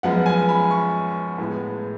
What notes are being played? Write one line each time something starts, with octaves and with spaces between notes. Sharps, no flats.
F#2 F3 G#3 B3 F#5
G#5
B5
C#6
A2 G#3 B3